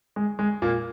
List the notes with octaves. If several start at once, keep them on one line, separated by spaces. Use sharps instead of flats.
G#3
G#3
A#2 A#3